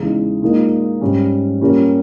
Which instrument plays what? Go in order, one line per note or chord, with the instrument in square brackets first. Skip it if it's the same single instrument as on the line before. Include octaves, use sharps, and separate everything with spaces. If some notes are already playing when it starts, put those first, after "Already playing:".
Already playing: [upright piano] E2 C#3 G#3 D#4
A#2 G#3 D#4 A#4
G#2 G3 C#4
A#2 G3 C#4 G4 A#4